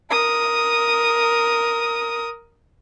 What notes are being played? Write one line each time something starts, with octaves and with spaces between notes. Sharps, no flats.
A#4 D#6